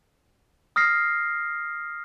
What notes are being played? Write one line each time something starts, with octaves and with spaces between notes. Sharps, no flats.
D#6 F6 A#6 C7